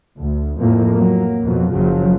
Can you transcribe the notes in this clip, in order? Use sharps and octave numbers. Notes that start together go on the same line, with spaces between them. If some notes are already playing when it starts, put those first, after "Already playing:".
D2
F2 A2 F3 A#3
F#3 A#3
F2 B2 F#3
F#1 F#2 C#3 F3 F#3